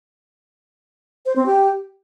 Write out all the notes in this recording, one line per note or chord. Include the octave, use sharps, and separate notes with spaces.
C5
C4
G4